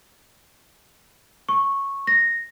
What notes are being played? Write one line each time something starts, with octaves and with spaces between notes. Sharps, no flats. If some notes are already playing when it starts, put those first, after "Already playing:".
C#6
A#6